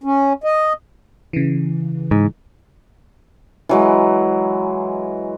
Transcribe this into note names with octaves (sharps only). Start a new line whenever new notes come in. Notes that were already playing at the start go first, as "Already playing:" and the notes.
C#4
D#5
C#3 E3
G#2
E3 F#3 G#3